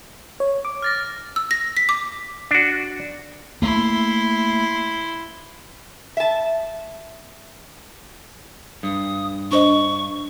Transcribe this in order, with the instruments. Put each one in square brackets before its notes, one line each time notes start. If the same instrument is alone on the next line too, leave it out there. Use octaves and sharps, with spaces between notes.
[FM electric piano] C#5
D6
[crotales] F6 A6 A#6
[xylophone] E6
A#6
B6
D6
[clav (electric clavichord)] D4 F#4
[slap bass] A3 A#3 [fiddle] E4 C6
[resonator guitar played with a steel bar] E5 A5
[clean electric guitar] G2 [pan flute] D#6
[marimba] D4 C5 D#5 [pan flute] C#6